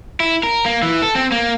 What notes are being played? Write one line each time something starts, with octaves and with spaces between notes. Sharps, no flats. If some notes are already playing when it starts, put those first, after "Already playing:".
E4
A#4
A#3
E3
A4
C4
A#3